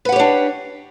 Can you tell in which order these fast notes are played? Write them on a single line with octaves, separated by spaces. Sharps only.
B4 F#5 G4 C#5 D4